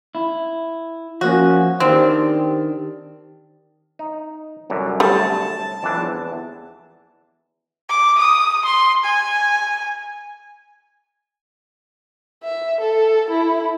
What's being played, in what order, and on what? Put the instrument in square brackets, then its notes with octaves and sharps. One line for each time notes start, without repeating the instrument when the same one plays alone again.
[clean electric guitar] E4
[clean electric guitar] F3 A#3 C#4 [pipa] F#4
[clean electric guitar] D#3 D4 G4 [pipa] C4
[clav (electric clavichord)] D#4
C2 F#2 D3
[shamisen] G3 A3 [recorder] A5
[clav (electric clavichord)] F2 E3 D4
E2
[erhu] D6
D#6
C6
G#5
[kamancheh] E5
A4
E4